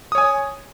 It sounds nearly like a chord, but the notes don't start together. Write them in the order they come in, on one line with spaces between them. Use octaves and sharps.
D#6 C#5 G#5